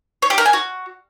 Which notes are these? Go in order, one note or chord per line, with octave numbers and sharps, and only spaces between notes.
C#5
G4
A#4
G#5
F#4